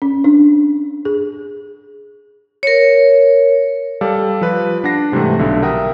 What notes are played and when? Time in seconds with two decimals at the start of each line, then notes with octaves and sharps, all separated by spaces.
0.02 C#4
0.24 D4
1.05 G#4
2.63 A#4 C#5
4.01 G3 A4 D5 F5
4.41 F3 B4
4.84 D4 F#5 A#6 C7
5.12 G#2 C3 E3 G3 A3
5.39 B1 D3 E5
5.62 A#4 E5 F#5 G5 A#5 D#6